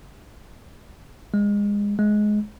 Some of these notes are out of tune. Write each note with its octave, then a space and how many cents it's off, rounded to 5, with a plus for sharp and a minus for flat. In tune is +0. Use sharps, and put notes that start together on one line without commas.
G#3 -25
G#3 +15